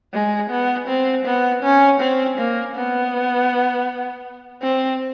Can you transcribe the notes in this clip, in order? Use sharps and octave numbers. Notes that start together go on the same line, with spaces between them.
G#3
B3
C4
B3
C#4
C4
A#3
B3
C4